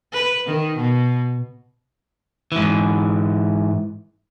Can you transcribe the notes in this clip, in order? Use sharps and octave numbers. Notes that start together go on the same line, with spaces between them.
B4
D#3
B2
G#2 E3